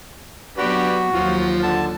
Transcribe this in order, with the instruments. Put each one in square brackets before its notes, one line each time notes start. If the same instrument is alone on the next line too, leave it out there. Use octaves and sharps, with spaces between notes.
[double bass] F#3 B3 [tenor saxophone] D4 [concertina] F#4 [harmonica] G4 B4 D5
[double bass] D#2 F#3 [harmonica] F3 [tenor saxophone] F4
[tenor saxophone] D3 [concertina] A5